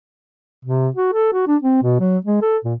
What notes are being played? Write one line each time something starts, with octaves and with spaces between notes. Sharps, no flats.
C3
F#4
A4
F#4
D4
C4
B2
F#3
G#3
A4
A#2